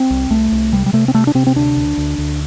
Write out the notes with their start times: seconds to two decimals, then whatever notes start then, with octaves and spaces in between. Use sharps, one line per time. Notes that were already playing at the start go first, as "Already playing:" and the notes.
Already playing: C4
0.10 C2
0.30 C2 A3
0.52 C2
0.72 C3 G3
0.86 G3
0.93 C3 A3
1.08 C4
1.14 C3 A3
1.27 D4
1.35 C3 C4
1.47 C4
1.56 D2 D4
1.77 D2
1.97 D2
2.18 D2